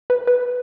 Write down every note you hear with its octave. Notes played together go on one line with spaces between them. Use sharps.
B4
B4